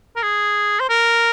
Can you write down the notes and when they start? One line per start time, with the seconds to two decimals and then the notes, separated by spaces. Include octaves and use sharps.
0.16 A#4
0.23 G#4
0.80 C5
0.89 A#4